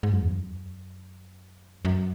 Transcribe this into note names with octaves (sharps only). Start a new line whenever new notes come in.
G#2
F#2
E2
F#2
F#2